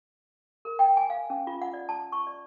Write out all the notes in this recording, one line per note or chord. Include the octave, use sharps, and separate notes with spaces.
A#4
G5
G#5
F5
C#4
F4
F#5
D5
A5
C#6
D5